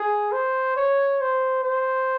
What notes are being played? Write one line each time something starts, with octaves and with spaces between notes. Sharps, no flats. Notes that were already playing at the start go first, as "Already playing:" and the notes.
Already playing: G#4
C5
C#5
C5
C5